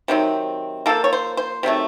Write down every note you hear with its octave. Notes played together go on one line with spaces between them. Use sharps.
C3 D#3 F#3 C4
F3 A#3 A4
C#5
C5
C5
C3 D#3 F#3 A3